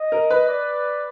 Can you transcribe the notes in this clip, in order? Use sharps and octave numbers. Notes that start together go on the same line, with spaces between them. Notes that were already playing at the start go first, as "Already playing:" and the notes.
Already playing: D#5
A#4
B4
D5